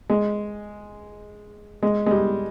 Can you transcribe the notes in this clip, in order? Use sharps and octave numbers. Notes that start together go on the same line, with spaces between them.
G#3
G#3
G#3
G3